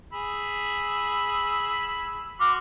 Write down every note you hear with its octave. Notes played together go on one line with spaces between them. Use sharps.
G#4 B5 E6
F#4 C6 D6 F6